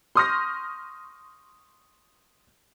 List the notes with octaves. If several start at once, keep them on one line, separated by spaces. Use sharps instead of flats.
C6 C#6 D#6 F6 G6 A#6